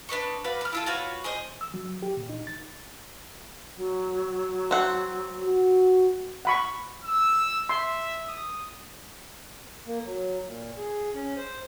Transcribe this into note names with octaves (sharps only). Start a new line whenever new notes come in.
D4 B4 D#5 C#6
F#4 B4 D5 F5
B5 F6
E4 F4 A4
F4 F#4 B4 C#5
G#4 C5 D#5
E6
F#3
G4
A#2
D#4
A6
F#3
C4 F#5
F#4
F#5 B5 C#6
E6
E5 C6
D#6
A#3
F#3
A#2
G#4
C#4
C5